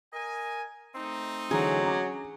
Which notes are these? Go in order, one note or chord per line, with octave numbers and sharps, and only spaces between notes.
A#4 D#5 G#5
A3 C4 D#4
D3 E3 F#3 G#4 A#5
C#4 A#5 D6